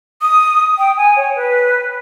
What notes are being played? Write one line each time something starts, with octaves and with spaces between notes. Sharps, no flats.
D#6
G5
G#5
C#5
B4